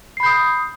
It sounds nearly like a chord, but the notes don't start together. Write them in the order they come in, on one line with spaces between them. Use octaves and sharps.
C7 B5 G6 D#6